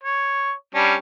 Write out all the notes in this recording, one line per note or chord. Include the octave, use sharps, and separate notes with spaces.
C#5
G3 C#4 D4